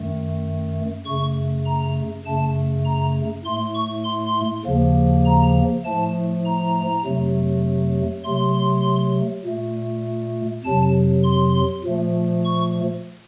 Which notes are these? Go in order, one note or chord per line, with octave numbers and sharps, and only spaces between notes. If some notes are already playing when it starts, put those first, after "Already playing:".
Already playing: F#2 D#3 A3
F#2 C#3 A3 C#6
A#5
F#2 C#3 A3 A5
A#5
A2 A3 C6
C#6
C6
D#2 C#3 F3 A#3
A#5
A2 F3 A3 A5
A#5
F2 C3 F#3 A3
C3 F#3 A3 C6
A#2 A3
F2 C3 F#3 A5
C6
A#2 F3 A3
C#6